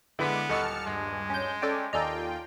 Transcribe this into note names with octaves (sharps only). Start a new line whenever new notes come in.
D3 G#3 B3 E4 B4 D6
D#1 A4 D#5 F#5 A5 C#6 F6 C#7
G2 G#3
C#4 G6
C#4 A4 D5 G5
D#2 F4 A4 D5 D#5 G5 G#5 A#5